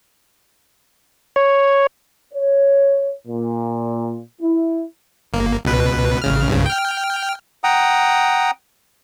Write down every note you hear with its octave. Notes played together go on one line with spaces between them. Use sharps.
C#5
C#5
A#2
E4
G1 A#3
C#2 B2 B4
A1 C#3 F6
C2 G2 C#3
G5 F6
F#5 G5 A#5 D#6